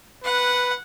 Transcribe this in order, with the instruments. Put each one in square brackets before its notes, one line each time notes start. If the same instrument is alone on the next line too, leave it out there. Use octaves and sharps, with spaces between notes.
[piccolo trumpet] B4 [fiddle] F#5